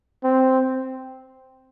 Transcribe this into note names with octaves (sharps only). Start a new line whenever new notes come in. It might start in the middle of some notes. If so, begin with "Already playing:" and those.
C4